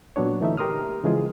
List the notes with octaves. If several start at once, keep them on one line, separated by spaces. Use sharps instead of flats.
A#2 F#3 B3 D4 C#5
D3 E3 A3 D#4 E5
G4 A#4 C6 D#6 F6
C#3 E3 F3 G#3 F4 G#4